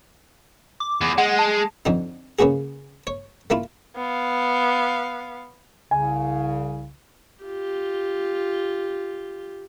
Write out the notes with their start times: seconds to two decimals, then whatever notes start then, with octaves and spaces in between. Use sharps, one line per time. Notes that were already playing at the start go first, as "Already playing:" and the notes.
0.80 D6
1.01 E2
1.18 G#3 F#5
1.39 A5
1.86 F2 D3 D#4
2.39 C#3 A#3 B3 F#4 G#4
3.07 C#5
3.50 A3 A#3 E4 F4
3.96 B3 F5
5.91 C2 C#3 G#5
7.43 F4 G4